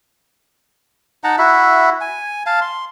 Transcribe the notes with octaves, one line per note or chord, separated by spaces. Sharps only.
D#4 F#5 A5 A#5
E4 F#4 E5
G#5
F5 A5
C6